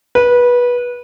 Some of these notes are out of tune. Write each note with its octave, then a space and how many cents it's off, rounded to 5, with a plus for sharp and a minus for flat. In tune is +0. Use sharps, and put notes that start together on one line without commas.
B4 -20